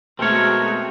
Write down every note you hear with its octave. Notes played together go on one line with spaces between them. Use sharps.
B2 G#3 A3 C4 F#4 A#4 C#5 E5